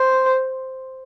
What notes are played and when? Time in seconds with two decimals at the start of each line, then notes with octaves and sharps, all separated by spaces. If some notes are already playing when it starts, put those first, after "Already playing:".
Already playing: C5